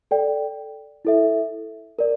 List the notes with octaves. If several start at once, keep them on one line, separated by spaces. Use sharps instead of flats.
A4 D5 G5
E4 A4 E5
A#4 D5